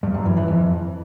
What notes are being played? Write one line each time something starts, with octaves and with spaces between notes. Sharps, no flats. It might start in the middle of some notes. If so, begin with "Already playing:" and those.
G2
F#2
E3
E3
F2